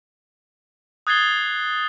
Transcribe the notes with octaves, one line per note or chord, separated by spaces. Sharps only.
D#6 F#6 G#6 A6 C7 G7